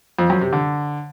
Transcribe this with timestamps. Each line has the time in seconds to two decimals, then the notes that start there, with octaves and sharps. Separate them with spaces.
0.19 F2
0.30 F#2
0.41 C3
0.53 D3